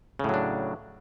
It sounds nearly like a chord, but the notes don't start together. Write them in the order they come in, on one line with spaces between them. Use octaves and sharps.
C#3 A2 F#3 D4